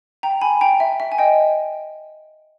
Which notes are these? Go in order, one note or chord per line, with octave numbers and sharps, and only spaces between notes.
G5 A#5
G#5 B5
G5 A#5
E5
E5
G#5
D#5 G5